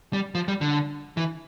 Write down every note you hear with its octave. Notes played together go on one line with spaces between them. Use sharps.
G3
F3
G3
D3
E3